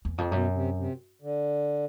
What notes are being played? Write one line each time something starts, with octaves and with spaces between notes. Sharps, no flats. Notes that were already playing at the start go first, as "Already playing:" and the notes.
E2
F2
F#2 B2
C3
C3
D3